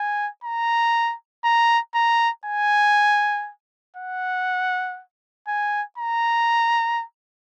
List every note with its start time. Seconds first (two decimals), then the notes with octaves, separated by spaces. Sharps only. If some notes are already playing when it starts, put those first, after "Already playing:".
Already playing: G#5
0.44 A#5
1.44 A#5
1.95 A#5
2.45 G#5
3.97 F#5
5.48 G#5
5.98 A#5